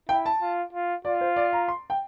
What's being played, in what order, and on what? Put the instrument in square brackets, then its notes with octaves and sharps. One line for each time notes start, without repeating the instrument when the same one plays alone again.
[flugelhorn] E4 [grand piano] G5
[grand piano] A5
[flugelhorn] F4
F4
[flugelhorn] F4 [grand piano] D5
[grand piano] C5
D5
A#5
C6
G5